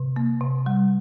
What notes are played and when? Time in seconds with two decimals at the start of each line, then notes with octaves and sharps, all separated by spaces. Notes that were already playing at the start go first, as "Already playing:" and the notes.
Already playing: C3
0.16 A#3
0.41 C3
0.66 G3